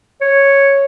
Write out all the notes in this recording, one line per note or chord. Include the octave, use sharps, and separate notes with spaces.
C#5